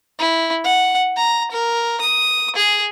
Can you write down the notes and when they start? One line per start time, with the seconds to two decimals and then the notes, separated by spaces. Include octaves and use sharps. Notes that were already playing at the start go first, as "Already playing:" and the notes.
0.19 E4
0.64 F#5
1.17 A#5
1.52 A#4
2.01 D#6
2.56 G#4